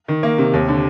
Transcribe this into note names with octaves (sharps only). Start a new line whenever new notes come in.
D#3
A#3
C3
D#2
D3